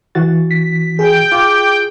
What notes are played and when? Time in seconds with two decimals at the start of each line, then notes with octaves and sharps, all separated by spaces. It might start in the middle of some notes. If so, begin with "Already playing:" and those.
0.15 E3 F#4 A6
0.51 B6
0.99 G#4 G5
1.32 F4 D6